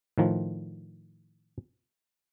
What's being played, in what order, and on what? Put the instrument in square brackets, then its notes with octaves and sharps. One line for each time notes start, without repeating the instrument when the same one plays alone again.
[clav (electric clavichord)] A2 D#3 F3